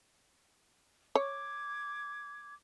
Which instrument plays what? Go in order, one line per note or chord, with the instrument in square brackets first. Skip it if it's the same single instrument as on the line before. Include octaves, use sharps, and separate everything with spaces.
[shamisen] C#5 [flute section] D6 G#6